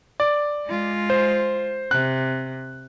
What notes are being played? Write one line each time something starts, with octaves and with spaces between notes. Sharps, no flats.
D5
G#3 F4
C5
C3 F#6